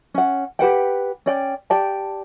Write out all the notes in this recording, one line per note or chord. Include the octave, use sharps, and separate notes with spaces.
C#4 F#5
G4 B4 F#5 G5
C#4 D5 G5
G4 D5 G5 A5